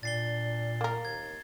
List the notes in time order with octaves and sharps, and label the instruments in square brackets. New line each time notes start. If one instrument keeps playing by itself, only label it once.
[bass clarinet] A#2 [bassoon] D4 [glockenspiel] A6 C7 G7
[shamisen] A#3 A#4
[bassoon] D#2 [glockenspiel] G#6